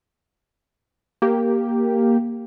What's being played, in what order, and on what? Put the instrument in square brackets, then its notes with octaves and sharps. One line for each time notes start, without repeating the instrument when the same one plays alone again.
[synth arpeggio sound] A#3 G4